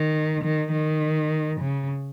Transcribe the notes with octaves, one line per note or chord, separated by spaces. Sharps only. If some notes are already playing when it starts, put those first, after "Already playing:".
Already playing: D#3
D#3
D#3
C#3